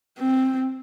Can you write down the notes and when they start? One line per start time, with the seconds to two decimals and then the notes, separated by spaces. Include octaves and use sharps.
0.18 C4